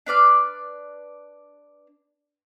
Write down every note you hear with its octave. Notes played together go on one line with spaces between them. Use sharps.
D4 B4 D5 F6